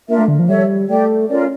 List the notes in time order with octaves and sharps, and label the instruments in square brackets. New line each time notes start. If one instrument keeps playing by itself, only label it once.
[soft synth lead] A#3 [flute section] D4 F4 A#4 E5
[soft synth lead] A3
D3
F3
[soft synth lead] G3 [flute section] A4 C#5 E5
[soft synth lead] A3 [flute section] G4 D5 G5
[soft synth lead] C#4 [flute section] F4 A#4 D5